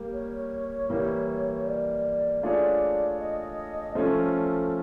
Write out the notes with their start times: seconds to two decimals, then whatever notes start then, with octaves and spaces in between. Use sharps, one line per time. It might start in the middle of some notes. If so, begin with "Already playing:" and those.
Already playing: G3 A#3
0.13 C#5
0.90 E3 G3 A#3
1.66 D5
2.42 A3 D4 F4 G#4 C#5 D5
3.19 D#5
3.94 F3 A3 C#4 A4